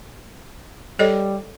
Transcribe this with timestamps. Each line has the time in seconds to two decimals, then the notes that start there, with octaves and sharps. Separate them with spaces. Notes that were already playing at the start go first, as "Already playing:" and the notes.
0.99 G3 A4 C#5 D#5